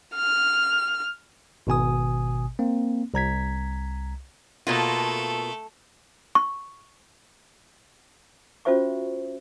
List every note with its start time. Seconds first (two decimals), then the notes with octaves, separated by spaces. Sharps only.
0.15 F6
1.67 G#1 B2 G#5 D#6
2.59 A#3 C4
3.14 C2 A#5 G#6 B6
4.67 B2 A3 A#3 F4 A4
6.35 C#6
8.65 C#4 F4 F#4 C5 E5 C#6